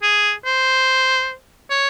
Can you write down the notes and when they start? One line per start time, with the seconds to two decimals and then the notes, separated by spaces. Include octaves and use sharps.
0.03 G#4
0.45 C5
1.70 C#5